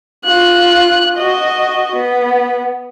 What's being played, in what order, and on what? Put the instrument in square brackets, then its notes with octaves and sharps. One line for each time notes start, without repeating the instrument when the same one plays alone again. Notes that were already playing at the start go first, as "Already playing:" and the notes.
[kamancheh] F4 F#6
F#4 D#5
B3